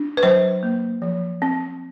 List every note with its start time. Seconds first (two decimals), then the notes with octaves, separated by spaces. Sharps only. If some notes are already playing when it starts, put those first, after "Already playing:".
Already playing: D4
0.17 B4
0.23 F#3 C5
0.63 A#3
1.02 F3
1.42 C4